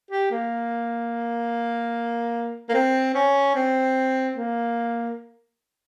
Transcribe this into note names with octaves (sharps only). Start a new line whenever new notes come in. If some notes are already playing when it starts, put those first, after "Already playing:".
G4
A#3
A#3
C4
C#4
C4
A#3